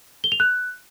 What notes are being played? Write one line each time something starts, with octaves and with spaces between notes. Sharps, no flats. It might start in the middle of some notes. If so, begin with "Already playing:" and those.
G7
F7
F#6